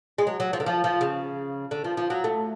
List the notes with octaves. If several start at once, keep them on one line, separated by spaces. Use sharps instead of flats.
G#3
F#3
F#3
F3
D3
F3
F3
C#3
D3
F3
F3
F#3
A3